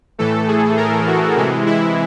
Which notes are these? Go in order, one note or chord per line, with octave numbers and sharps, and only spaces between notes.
A2 E3 A3 A4
G#4
A#4
F#4
C3 E3 G#3
E4